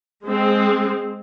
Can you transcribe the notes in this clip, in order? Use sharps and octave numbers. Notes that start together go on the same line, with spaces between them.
G#3 C4